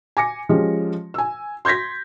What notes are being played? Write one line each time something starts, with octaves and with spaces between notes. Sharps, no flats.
G#5 D6 A#6 C#7
F3 G#3 C#4 G4
G#5 E6
C6 G6 G#6 A#6 B6